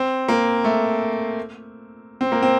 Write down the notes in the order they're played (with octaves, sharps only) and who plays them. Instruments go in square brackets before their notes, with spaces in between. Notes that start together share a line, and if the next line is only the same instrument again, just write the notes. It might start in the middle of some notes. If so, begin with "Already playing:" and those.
Already playing: [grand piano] C4
A#3
A3
C4
A#3
C4